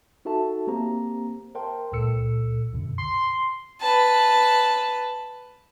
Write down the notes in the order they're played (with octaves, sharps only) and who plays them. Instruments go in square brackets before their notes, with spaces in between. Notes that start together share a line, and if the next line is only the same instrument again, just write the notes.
[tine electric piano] D#4 F#4 A4 E5 A5
A#3 C4 G4 C5 A#5
A#4 C5 E5 G5 A5 C6
C#2 A#2 A4 E6 C#7
C2 F#2 B2 D3
[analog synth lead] C6
[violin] B4 A5